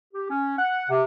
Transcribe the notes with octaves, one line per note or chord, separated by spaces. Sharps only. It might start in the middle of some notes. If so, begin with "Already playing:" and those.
G4
C#4
F#5
C3